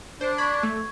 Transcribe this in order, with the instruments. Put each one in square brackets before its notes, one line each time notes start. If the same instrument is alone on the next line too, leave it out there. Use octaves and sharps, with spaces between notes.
[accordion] D4 [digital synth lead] C5
[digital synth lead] B5 [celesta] C#6 G#6
[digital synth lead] A3